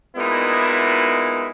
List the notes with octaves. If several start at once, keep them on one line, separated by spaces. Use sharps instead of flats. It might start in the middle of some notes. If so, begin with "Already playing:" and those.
A#2 G#3 B3 D#4 E4